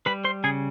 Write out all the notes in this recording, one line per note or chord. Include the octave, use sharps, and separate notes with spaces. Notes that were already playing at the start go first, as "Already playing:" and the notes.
G3 B4 B5
C5 C6
C#3 G#4 G#5